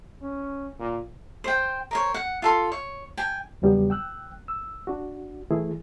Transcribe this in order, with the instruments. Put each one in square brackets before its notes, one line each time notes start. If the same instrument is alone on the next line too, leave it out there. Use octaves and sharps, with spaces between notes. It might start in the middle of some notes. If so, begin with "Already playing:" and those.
[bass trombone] C#4
A#2
[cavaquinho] C5 G5
A#4 C5 C#5
F#5
F4 A4 C6
C#5
G5 G#5
[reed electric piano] E2 C#3 F#3 G3 B3
G5 E6 F#6
E6
D4 F#4
E3 A3 E4 G#4